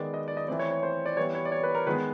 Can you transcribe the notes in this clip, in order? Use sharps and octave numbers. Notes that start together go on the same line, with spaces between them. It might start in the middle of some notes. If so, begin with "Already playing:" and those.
Already playing: D#3 G#3 B3 D5
D#5
D5
D#5
E3 A3 C4 D5
C#5
C#5
C5
D5
E3 G3 B3 C#5
C#5
D5
C#5
B4
A#4
D#3 G#3 B3 B4